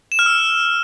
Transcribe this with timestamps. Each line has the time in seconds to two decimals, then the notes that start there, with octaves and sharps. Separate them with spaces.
0.12 E7
0.19 F6
0.26 E6